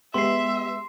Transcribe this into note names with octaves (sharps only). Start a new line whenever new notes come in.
G#3 B3 G4 E5 C6 C7